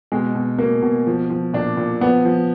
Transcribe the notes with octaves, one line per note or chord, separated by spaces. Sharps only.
B2 G#3
B2
B2 A#3
B2
F3
F3
A#2 D4
A#2
F3 B3
F3